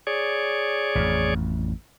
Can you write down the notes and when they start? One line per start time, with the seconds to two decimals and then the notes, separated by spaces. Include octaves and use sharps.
0.07 G#4 C#5 D5
0.95 A1 F2